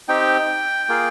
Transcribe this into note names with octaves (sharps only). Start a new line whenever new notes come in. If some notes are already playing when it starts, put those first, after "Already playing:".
C4 D#4 G4 G5
A#3 F4 G#4